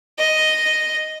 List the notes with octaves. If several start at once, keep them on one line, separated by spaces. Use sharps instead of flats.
D#5